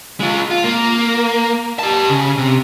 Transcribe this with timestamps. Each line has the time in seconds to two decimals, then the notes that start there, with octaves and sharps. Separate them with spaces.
0.20 G#3 F4
0.51 F4
0.64 A#3
1.79 G4 A5
2.09 C#3
2.38 C3